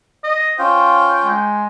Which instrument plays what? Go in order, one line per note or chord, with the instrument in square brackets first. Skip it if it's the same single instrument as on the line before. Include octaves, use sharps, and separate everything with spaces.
[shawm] D#5
[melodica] C#4 F4 F5 [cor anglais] C5 [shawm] G5
[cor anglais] G#3